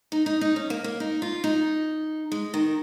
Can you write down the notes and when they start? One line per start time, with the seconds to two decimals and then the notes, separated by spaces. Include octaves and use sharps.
0.12 D#4
0.26 D#4
0.41 D#4
0.56 C#4
0.70 A#3
0.84 A#3
1.00 D#4
1.22 F4
1.44 D#4
2.32 G#3
2.54 D#3